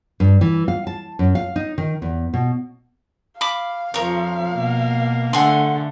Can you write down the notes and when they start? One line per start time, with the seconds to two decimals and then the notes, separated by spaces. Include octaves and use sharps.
0.20 G2
0.41 E3
0.68 F5
0.87 A5
1.19 F#2
1.35 F5
1.56 D#4
1.78 D#3
2.02 E2
2.34 B2
3.41 F5 B5 D6
3.94 F2 F3 A#4 C#5
4.52 B2 A#3
5.33 D3 A3 F#5 G#5 C6